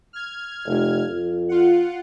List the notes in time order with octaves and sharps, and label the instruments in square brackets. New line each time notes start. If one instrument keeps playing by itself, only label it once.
[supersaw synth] F6 G#6
[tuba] F1
F2
[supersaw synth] F4 F#5